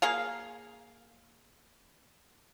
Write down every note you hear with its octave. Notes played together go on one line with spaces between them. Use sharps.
A#3 G#4 F5